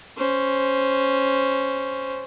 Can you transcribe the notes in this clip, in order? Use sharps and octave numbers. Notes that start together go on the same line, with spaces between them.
C#4 C5